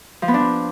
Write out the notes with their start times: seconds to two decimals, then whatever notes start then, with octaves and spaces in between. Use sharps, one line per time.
0.22 F3
0.28 B3
0.34 D4
0.40 F3